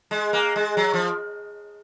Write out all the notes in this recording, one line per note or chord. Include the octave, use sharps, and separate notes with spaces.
G#3
A#3
G#3
F#3
F3